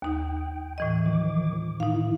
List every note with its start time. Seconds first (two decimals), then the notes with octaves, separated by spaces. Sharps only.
0.02 D#2 D#4 G5 D#6
0.78 A2 E3 D#5
1.06 D#3 F3 D6
1.80 A2 D#3 D#4 E4 F5